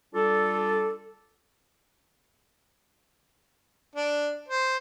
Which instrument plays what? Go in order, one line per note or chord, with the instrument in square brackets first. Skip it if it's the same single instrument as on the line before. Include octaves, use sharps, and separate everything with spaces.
[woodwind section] G3 D4 F4 A4
[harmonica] D4
C5